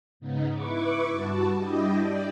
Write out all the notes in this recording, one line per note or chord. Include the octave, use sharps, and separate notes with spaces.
G#2 C#3 B3 D#4
E4 B4 C#6 D6
G2 F#4 A5
G3 D4 E4 G4 D#5
D5 G5